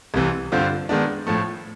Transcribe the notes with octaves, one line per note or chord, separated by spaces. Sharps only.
C2 C3 E3
G2 D3 G3 C4 F4
D#3 G#3 B3 D4
A2 F3 A3